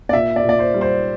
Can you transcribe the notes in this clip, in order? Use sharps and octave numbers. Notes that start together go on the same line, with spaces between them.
D5
A#2 E5
D5
A#2
D5
C5
G3
C5